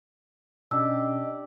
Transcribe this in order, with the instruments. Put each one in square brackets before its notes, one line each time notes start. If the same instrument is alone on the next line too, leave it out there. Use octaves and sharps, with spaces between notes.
[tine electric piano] B2 C#4 [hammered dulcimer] D4 G4 [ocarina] D#5 [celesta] E6